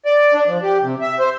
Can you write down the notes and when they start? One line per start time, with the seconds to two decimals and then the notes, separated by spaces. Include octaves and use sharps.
0.05 D5
0.34 D4
0.47 F3
0.63 G4
0.82 C3
1.01 E5
1.19 C5